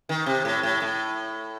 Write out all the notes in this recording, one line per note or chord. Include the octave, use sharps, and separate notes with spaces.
D#3
C3
A2
A2
A2